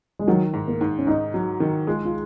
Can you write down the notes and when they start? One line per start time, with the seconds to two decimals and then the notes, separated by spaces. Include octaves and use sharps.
0.19 G#3
0.28 D#3 F#3
0.53 G#2
0.68 A#3
0.81 G#2
0.98 C#4
1.07 G#2 D#4
1.34 F#3
1.60 D#3
1.87 G#3 F4
2.05 F4